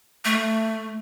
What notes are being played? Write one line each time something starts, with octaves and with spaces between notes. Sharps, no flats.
A3